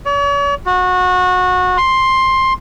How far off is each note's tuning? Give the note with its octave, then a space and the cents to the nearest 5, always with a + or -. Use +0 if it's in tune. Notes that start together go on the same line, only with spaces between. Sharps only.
C#5 +45
F#4 -25
C6 +10